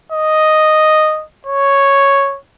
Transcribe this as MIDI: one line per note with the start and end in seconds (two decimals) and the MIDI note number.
0.12 1.24 75
1.46 2.38 73